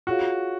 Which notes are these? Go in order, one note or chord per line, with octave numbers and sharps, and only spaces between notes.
F4 F#4 G#4 C#5 F5